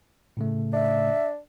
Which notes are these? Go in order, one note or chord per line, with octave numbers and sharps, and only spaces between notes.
A2 C#3 A3
D4 E5